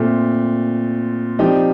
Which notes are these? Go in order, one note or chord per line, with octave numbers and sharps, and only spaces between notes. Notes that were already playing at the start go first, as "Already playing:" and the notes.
Already playing: A#2 A3 C4
F3 C4 D#4 G4 D5